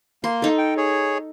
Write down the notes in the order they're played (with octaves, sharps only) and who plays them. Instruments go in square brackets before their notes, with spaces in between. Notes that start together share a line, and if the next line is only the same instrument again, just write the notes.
[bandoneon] A#3 [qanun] C6
[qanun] D#4 A4
[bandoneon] G5
G#4 C#5